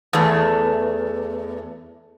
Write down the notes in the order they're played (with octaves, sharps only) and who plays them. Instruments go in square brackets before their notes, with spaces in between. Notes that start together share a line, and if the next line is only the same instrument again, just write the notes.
[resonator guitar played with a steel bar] E2 A3